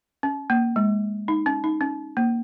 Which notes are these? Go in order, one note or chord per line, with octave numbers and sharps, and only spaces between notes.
C#4
A#3
G#3
D#4
C#4
D#4
C#4
A#3